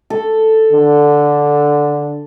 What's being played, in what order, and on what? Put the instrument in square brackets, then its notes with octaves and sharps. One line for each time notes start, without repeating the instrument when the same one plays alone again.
[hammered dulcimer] A4
[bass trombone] D3